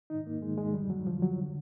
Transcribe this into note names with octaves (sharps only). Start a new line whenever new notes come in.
G#2 D#3 D#4
A#3
G#2 D#3 G#3
G#3
F2 D3 G3
F#3
F2 D3 F3
F#3
D3